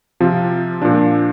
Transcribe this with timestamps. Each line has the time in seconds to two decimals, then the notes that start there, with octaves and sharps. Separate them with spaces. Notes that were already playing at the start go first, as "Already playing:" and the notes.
0.20 C3 F3 C4 F4
0.82 A#2 F3 D4